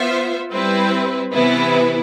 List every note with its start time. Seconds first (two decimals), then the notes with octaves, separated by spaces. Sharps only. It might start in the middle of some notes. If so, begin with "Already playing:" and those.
Already playing: B3 F4 C5 E5
0.51 G3 C4 E4 B4
1.33 C3 E3 B3 E4 B4